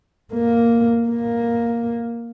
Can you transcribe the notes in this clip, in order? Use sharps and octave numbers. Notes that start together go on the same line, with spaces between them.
A#3
A#3